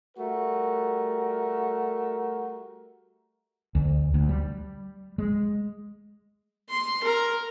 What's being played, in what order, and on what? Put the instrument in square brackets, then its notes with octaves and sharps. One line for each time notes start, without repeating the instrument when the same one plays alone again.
[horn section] G3 A3 F#4 A#4
[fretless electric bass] D2
D2
G3
G#3
[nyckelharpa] C6
A#4